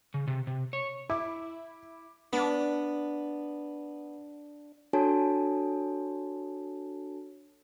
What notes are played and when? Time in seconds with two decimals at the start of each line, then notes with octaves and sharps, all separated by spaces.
0.14 C#3
0.27 C3
0.47 C3
0.73 C#5
1.10 E4 D6
2.33 B3 D4
4.93 D4 F#4 A4 C#5 G#5 A5